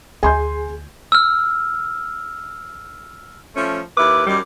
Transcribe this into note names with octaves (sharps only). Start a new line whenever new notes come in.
D2 G#4 G#5 C6 G6
E6 F6
F3 A3 C#4
D#2 E4 B4 D6
F#2 D#3 G3